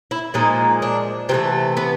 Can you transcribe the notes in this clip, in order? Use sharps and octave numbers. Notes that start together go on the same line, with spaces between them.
E4
A#2 F3 G#3 D#4
D4
C3 E3 A3 C4
B3